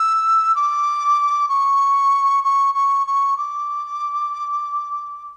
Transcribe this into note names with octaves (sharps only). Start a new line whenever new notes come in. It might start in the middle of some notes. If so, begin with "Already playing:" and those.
Already playing: E6
D6
C#6
C#6
C#6
C#6
D6